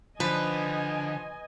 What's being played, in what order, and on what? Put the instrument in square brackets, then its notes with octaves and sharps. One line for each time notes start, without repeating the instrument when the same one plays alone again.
[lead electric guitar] D3 [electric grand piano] F3 [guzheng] B4 [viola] D#5 G#5